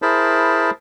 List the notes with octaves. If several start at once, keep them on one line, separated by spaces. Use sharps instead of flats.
E4 G#4 A#4 C5 A5 B5